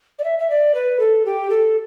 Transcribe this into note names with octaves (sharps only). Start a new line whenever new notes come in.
D5
E5
E5
D5
B4
A4
G4
A4